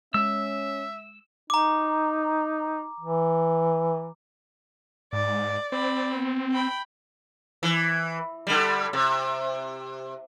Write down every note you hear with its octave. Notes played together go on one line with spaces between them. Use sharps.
G#3 C#4 E5 E6
D#4 A#5 D6
E3
G#2 D5
C4 D5 B5
B3
G5 B5
E3
D3 G3
C3